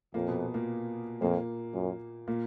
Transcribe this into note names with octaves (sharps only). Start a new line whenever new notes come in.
F2 A#2 A#3
B2 B3
A#2 A#3
F2 A#2 A#3
F#2
A#2 A#3